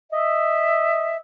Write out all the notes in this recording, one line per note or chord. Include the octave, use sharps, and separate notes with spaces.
D#5 E5